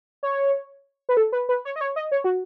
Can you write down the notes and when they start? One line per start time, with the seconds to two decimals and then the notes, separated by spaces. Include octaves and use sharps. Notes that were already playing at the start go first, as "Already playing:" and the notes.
0.23 C#5
1.09 B4
1.17 A4
1.32 B4
1.49 B4
1.65 C#5
1.76 D#5
1.81 C#5
1.96 D#5
2.12 C#5
2.24 F#4